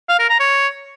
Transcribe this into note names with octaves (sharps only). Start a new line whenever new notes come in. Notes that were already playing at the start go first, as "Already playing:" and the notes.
F5
A#4
A#5
C#5